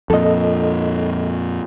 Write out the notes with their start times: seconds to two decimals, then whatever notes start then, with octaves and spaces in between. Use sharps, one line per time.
0.10 F2 A#2 A4 D#5